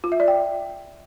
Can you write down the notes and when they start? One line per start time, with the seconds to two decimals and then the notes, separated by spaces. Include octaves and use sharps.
0.04 F4
0.12 E5
0.20 D5
0.28 G5